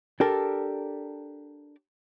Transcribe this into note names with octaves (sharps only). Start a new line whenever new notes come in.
D4 G4 A4 A#4